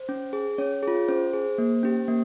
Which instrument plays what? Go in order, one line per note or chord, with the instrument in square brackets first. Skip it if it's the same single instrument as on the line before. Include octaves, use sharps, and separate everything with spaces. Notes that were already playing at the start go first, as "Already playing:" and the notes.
Already playing: [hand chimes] C5
C#4
G#4
C#4 C#5
F4 G#4
C#4 C5
G#4
A#3
C#4 G4
A#3